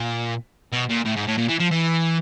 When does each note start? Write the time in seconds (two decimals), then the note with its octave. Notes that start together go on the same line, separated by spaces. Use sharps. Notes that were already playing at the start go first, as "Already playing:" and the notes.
Already playing: A#2
0.73 B2
0.90 A#2
1.06 A2
1.17 G#2
1.27 A2
1.38 A#2
1.49 E3
1.59 F3
1.71 E3